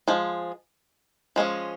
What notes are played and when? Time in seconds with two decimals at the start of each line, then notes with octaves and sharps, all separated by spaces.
0.08 F3 G#3
1.36 F3 G#3 C#4